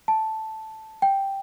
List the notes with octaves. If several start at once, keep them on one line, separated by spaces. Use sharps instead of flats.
A5
G5